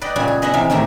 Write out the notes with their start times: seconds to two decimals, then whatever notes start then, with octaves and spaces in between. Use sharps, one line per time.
0.02 B4 D5 D#5 G5
0.16 A#2 C#3 G3 F#4
0.28 G#4
0.42 B3 D#5 E5 F#5
0.54 C3 E3 E5 F5
0.70 A2 D#3 A3 E4 G4